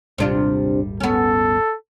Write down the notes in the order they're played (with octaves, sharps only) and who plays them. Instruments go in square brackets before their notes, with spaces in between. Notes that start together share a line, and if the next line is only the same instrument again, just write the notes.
[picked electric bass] D#1 G#1 G3 [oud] C3 D4 F4
[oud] B3 C#4 [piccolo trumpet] A4